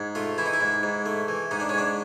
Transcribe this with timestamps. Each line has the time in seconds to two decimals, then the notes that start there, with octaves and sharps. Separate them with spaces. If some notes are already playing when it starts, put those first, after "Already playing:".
Already playing: G#2
0.15 A3 F4
0.38 E3 E4
0.46 D#4
0.54 E4
0.61 G#2
0.83 G#2
1.06 A3
1.28 E3
1.51 G#2 D#4
1.60 D4
1.69 C#4
1.74 G#2 D4